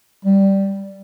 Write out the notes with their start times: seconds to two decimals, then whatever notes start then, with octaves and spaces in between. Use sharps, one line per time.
0.25 G3